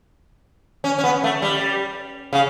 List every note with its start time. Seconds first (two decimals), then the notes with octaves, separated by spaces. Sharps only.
0.84 C#4
0.99 C#4
1.04 B3
1.24 A3
1.42 G3
2.33 C#3